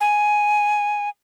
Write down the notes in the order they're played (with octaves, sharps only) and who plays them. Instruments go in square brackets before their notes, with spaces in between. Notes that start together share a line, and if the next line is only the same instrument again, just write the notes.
[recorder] G#5